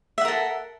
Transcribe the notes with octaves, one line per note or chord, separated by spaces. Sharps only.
A4 A#4 E5 F#5